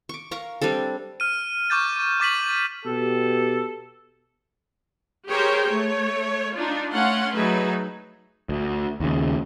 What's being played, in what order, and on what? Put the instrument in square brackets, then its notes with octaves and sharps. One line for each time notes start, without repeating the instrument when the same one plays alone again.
[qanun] C#6 D6
A#4 F5 A#5 C#6
G3 C4 D4 A4
[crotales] F6 D#7
C#6 D6 G6 A6
C#6 D6 A6 B6 D#7 F#7
[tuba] B2 [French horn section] G4 [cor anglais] A4
[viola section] G4 G#4 A#4 C5 C#5 G5
A3 C#5
D4 D#4 F4
A3 C#4 F5 F#5 C6
F#3 A3 D#4 G#4 B4 E5
[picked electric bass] D2
D#2 C#3